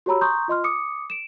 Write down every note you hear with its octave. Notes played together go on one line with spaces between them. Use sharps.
F#4 G4 C#5 A#5 B5 E6
A#5 C6 C#6 D#6 G6
F4 D#5 C6 F6
D6 D#6 C#7
D7 E7